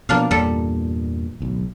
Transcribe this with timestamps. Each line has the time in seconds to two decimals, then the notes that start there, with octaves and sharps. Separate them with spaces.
0.09 B2 F3 A#3 B3 D4 F5
0.31 E2 G2 A#2 G3 A4
1.40 D1 B1